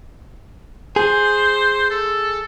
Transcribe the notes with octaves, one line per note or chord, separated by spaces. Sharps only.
G#4 C5
A4